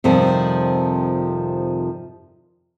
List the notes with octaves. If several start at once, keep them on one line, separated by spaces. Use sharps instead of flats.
F2 C3 D#3 F3 G3